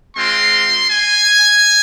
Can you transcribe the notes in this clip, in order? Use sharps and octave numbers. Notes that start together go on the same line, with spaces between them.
G#3 C4 F4 C6
G#5